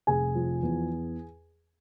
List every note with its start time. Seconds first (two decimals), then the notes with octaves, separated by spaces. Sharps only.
0.07 F1 G#4 G#5
0.35 F3
0.63 E2